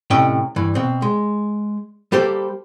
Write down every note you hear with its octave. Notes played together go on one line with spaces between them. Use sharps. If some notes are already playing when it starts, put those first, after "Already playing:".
A2 C3 C#4 D#5 G5
G2 E3
B2 C4
G#3
G3 A#3 G4 A4 C5